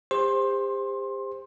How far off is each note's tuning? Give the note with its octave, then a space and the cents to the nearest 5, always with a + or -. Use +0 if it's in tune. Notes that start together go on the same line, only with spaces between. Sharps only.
G4 +40 C5 +0 C6 +20